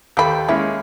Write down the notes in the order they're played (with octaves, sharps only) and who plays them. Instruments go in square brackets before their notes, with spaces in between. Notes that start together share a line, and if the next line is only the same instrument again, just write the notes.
[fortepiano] D#2 A4 G5 [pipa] A#3 B5
[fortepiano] G#3 A#3 C#4 [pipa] E4